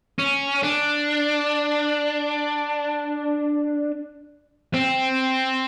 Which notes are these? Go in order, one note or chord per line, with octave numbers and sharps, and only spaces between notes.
C#4
D4
C4